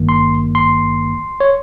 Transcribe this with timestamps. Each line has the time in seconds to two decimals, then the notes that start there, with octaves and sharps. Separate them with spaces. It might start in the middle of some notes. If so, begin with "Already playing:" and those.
Already playing: G#1 G2 D#3 A#3
0.09 C6
0.55 C6
1.40 C#5